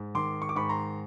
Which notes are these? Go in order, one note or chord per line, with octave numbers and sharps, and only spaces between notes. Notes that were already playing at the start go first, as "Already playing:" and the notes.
Already playing: G#2
D#3 C6 D6
C#6
D6
G#2 B5 C#6
A#5 C6